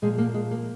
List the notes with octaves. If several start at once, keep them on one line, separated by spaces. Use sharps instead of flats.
A#2 F3 G#3
A#3
G#3
A#3